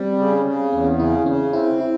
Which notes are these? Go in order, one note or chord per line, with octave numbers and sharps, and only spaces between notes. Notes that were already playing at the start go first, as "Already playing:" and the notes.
Already playing: G3 C4
C#3
C#4
C#3
E2 C#4
C#3 E4
C#3 C#4
C4 E4
E4